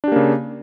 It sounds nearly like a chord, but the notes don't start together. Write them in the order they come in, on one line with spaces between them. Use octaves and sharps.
D4 G4 A#3 C#3